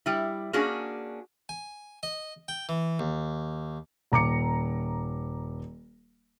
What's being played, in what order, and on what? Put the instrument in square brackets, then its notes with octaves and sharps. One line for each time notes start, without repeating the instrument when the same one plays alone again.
[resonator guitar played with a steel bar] G3 E4
A#3 C#4 D4 F#4 G#4
[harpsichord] G#5
D#5
G5
E3
D#2
[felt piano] D#1 A#5 D6 C#7